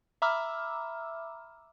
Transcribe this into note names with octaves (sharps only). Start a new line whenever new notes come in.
E5 A#5 B5 D6 E6 F6